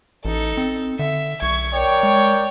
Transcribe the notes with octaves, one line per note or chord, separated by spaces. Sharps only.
A1 D#4 A4
C4
D3 E5
B1 C#6 G#6
A#4 C#5 D5 G5
G#3